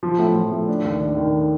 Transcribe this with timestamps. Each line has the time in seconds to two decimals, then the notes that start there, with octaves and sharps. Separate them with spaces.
0.03 F3
0.19 A2
0.35 F3
0.52 A2
0.68 D4
0.84 D#2
1.01 D4
1.17 D#3